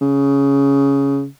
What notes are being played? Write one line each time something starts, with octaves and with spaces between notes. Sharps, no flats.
C#3